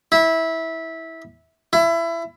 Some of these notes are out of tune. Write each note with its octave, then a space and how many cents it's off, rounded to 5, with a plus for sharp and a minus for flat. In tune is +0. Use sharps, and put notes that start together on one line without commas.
E4 -15
E4 +25